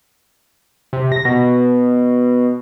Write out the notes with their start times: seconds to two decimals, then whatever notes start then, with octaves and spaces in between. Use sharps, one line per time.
0.93 C3
1.12 A#6
1.25 B2